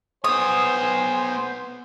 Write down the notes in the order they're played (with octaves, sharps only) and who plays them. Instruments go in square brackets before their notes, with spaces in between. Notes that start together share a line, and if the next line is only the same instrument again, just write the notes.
[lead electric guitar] B3 C#5 [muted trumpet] C5 [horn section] G#5 [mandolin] D#6